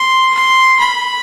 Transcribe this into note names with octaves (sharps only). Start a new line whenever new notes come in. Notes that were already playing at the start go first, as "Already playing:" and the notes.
Already playing: C6
C6
B5